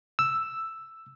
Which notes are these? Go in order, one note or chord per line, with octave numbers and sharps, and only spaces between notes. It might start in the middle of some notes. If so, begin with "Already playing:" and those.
E6